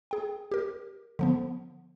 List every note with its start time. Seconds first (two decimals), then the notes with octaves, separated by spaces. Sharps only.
0.11 G#4 G5
0.51 G4 A#4
1.19 D3 F3 B3